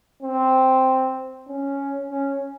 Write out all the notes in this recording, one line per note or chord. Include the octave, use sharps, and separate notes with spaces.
C4
C#4
C#4